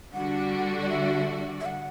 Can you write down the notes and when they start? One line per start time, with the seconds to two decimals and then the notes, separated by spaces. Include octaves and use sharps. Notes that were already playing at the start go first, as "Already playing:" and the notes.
0.13 D3 G3 D4 F#4 F#5
0.82 D5
0.89 E5
1.61 E5
1.66 F#5